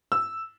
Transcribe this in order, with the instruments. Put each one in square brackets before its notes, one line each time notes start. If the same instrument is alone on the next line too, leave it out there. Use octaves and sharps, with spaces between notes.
[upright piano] E6